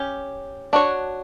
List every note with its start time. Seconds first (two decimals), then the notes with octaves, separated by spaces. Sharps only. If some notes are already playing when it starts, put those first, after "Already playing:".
Already playing: C#4 G4
0.73 D4 F#4 C#5